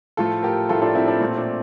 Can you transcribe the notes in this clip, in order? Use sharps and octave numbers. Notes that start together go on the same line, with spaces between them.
A2 F3 A3 F4 A4
G4 A#4
A2 F3 A3 F4 A4
D4 F4
C4 E4
D4
A#2 A3 C4
D4